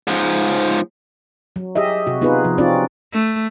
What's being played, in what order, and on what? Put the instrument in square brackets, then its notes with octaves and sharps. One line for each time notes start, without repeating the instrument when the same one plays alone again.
[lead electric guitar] G#2 F3
[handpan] F#3
G4 G#4 D#5 E5
C3 F#4
B3 D#4 F4 G#4 B4
C3 F3
C4 C#4 D#4 F4 F#4 D5
[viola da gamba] A3